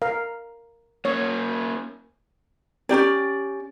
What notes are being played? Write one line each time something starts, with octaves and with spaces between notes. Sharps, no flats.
A#4 F5
A#3 C#4 C#5
C#4 D#4 G4 D5